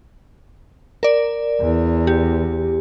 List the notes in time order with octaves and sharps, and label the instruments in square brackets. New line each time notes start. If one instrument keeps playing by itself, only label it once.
[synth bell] A#4 D5
[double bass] E2
[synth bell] G4